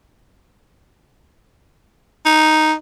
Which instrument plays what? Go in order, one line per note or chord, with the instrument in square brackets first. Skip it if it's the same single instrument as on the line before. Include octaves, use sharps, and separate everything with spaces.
[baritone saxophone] D#4